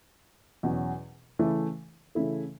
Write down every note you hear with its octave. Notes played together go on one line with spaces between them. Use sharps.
E2 B2 F#3 C#4 F#4
C#3 E3 A3 E4 A4
C#3 E3 A3 E4 A4